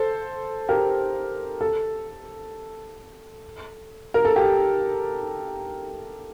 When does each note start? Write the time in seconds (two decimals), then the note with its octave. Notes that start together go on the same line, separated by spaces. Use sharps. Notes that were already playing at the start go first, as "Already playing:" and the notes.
Already playing: A4 C5
0.69 G4 A#4
1.61 A4
4.14 A#4
4.25 A4
4.36 G4